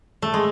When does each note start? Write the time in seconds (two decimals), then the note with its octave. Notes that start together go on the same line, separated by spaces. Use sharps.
0.22 A3
0.34 G#3